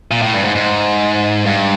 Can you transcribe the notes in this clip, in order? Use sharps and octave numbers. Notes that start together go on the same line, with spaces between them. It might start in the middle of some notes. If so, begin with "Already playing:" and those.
A#2
A2
G2
G#2
G#2
G2